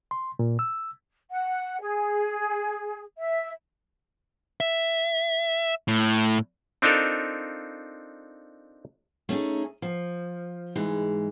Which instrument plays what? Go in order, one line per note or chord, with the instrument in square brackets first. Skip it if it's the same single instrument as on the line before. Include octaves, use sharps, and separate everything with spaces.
[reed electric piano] C6
A#2
E6
[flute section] F#5
G#4
E5
[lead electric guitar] E5
A2
[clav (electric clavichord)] C4 D4 D#4 F4 A4 A#4
[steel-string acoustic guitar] A3 C#4 D#4 G#4
F3
G#2 E3 G#3